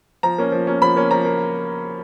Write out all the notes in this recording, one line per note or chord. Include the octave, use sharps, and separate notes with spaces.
F3 A#5
A#3 C#4
F3
A#3 C#4
F3 B5
A#3 C#4
F3 A#5
A#3